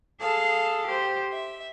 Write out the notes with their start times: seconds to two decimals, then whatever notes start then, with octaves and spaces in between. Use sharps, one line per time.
0.21 G#4 A4 F5 A5
0.87 G4 C5
1.31 E5